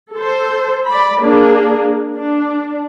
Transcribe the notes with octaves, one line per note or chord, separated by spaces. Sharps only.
A4 C5
D5 B5
A#3 D4 G#4
D4